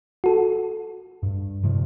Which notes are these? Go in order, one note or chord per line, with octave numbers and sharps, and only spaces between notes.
F#4 A4
G2
A2 C3 F3